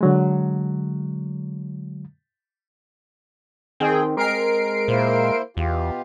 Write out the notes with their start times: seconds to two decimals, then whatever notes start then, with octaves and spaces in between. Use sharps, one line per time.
0.01 D3 F#3 G#3
3.80 D#3 C4 G#4 G5
4.17 G#3 A#4 C7 D7
4.88 A#2 A#3 E4 C5
5.57 E2 B2 F4 G4